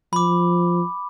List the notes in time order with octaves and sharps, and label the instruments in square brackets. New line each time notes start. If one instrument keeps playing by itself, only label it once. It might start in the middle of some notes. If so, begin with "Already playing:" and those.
[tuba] F3 [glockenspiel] B5 D6